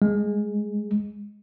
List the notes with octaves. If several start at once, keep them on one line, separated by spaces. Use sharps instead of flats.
G#3